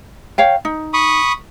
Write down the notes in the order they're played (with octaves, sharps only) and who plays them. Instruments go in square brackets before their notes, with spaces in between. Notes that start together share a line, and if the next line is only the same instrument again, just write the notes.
[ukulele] C#5 F5 G5
D#4
[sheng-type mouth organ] B5 C#6 D#6